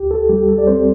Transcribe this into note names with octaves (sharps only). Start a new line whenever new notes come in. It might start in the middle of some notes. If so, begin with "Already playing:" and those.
Already playing: D2 G4
A4
G3 G4
A4
D5
C4 C5